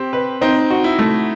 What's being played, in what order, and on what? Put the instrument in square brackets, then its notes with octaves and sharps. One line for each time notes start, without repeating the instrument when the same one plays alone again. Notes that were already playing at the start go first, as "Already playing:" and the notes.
Already playing: [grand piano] C4 [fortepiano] G4
[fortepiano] B4
[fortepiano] C4 [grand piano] D#4
[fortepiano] F#4
[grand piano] E4
[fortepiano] A3